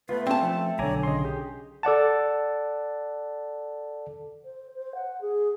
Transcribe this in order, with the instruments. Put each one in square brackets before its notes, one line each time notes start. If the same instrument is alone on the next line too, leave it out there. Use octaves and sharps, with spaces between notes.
[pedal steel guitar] A3 B3 F4 [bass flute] B4
[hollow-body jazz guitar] C4 A5 [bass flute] C#4
[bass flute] F3 [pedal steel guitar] A3 A4
[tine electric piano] B1 D3 [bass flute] C#5 [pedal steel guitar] D5 G#5 A#5
[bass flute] C#3 [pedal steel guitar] D#5 C6
[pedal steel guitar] G4 [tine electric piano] G#4
[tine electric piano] A4 D5 F#5 A5
[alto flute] C5
C5
F#5
G#4